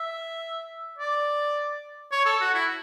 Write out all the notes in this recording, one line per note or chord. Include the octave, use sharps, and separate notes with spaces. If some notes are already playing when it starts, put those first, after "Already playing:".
Already playing: E5
D5
C#5
A4
F#4
E4